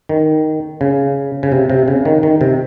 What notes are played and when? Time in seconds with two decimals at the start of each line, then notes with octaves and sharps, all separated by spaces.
0.09 D#3
0.81 C#3
1.43 C#3
1.52 C3
1.70 C3
1.88 C#3
2.05 D#3
2.23 D#3
2.41 C3